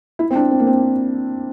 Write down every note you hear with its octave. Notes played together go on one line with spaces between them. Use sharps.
E4
C4
D4
C4
A#3
C4